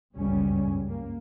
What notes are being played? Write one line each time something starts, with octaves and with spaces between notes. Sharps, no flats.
G1 C#2 F#2 C#3 G3 C#4
A#3